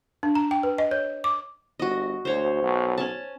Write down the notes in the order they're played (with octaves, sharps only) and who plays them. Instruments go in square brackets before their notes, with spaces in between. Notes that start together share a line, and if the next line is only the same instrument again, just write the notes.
[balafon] D4
A#5
G5
B4
D#5
C#5
D6
[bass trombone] G1 [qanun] F#4 D#5
[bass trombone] D2 [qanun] C5 C#5
[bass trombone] B1
[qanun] C#4 G#5 A5